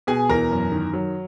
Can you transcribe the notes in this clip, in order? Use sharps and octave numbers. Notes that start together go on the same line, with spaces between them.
B2 G#4 G#5
E2 A#4 A#5
F#2
D#3
F#3